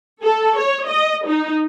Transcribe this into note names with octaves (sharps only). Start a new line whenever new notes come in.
A4
C#5
D#5
D#4